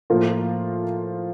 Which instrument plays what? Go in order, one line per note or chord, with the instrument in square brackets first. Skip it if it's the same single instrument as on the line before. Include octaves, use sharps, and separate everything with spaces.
[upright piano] A2 F3 A#3 F4 A#4